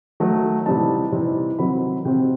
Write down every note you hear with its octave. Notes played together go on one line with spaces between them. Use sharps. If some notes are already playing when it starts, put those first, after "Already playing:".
D#3 F#3 A3 D#4
C3 E3 G3 C4 D#4 A5
C3 E3 G3 C4 D#4
C3 D#3 F#3 C4 B5
C3 D#3 F#3 C4 G5